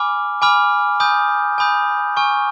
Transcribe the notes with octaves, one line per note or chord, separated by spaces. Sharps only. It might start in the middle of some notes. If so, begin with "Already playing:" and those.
Already playing: G#5 B5 D6 F6
G#5 B5 D6 F6
G#5 B5 D#6 G6
G#5 B5 D#6 G6
G#5 C#6 F6